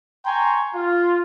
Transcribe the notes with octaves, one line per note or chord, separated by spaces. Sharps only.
G5 G#5 A#5 C6 C#6
F4